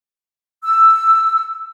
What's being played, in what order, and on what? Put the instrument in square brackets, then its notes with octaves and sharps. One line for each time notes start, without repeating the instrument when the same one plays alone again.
[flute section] E6